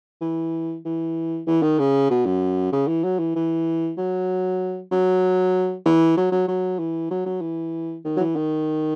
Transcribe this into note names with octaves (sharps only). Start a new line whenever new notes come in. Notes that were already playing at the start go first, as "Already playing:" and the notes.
E3
E3
E3
D#3
C#3
B2
F#2
C#3
E3
F#3
E3
E3
F#3
F#3
E3
F#3
F#3
F#3
E3
F#3
F#3
E3
D#3
F#3
E3
D#3